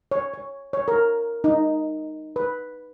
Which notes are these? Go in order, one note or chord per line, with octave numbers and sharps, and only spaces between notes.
C#5
C#5
C#5
A#4
D#4
B4